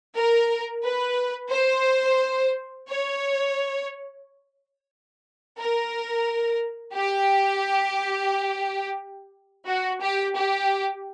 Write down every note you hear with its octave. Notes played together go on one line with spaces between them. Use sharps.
A#4
B4
C5
C#5
A#4
G4
F#4
G4
G4